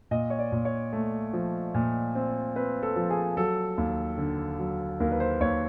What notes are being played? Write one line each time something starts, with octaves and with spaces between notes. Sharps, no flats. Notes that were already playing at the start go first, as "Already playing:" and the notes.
A#2 D#5
C#5
D5
A#2
C#5
A3
F3
A#2
C4
C4 B4
A4
F3
G#4
F#3 A4
D#2
D3
F#3
D#2 A#4
B4
C5
D#2 C#5